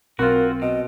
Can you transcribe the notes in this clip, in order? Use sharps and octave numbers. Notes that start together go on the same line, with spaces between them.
B1 C4 F4 F#4 A#4
B2 D#5